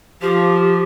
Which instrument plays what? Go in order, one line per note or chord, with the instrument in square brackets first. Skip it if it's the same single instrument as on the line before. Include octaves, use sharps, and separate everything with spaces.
[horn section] F3 [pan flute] G4